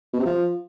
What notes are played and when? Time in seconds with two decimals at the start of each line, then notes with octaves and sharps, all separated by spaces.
0.13 B2
0.20 C3
0.26 F3